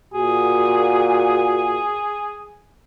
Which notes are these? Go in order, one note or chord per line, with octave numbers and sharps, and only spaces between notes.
A#2 F#4 G#4